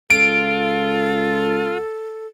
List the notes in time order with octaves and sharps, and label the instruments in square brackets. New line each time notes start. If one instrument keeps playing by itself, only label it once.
[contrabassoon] C#2 [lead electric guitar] F4 [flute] A4 [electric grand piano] D7